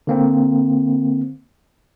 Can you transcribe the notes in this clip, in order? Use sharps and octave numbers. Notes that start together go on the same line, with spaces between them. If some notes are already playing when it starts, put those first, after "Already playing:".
D3 A#3 C4